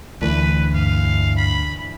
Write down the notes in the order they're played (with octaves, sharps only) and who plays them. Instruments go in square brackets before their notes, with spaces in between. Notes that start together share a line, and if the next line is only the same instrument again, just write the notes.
[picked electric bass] D2 [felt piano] E3 D4 [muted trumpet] B4
[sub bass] G2 [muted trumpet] F5
[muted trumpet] B5